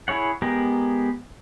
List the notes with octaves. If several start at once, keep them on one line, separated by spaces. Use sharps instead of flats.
E4 G#4 C#5 F#5
G#3 B3 G4 A#4